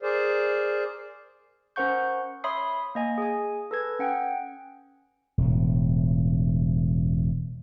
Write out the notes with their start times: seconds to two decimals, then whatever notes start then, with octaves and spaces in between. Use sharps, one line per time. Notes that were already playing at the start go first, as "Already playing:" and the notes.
0.03 G#4 A#4 C5 D5
1.76 C#4 A#4 C5 F#5 C#6 G6
2.44 C#5 E5 B5 C6 D#6 C7
2.95 A#3 D#5 G#5
3.18 G#4 G#5
3.71 A4 B4 G#6
3.99 C#4 F#5 G5
5.38 E1 A2